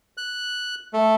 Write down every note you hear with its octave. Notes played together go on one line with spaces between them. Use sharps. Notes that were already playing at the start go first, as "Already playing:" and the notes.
F#6
A3